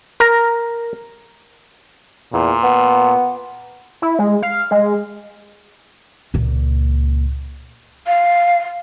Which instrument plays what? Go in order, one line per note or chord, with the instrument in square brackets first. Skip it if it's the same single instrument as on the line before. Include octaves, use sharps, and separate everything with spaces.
[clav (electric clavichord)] A#4 A#5
[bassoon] E2 [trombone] A#2
[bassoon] B3
[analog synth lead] E4
G#3
F5
G#3
[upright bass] C#2 A#2
[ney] F5